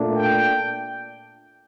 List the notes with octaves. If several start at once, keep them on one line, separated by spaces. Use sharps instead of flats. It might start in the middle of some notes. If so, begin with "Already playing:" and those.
Already playing: A#2 A3 D4
G5